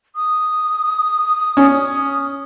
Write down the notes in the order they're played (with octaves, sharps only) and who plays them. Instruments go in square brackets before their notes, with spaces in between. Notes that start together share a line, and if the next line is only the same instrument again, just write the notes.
[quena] D#6
[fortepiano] C#4